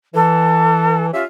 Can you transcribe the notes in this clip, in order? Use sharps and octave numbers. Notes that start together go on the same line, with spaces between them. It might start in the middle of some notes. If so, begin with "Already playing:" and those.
E3 A4
C#4 F4 G4 E5